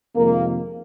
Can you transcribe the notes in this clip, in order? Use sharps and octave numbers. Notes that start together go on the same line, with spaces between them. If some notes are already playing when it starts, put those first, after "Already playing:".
F2 C3 D#3 G#3 A#3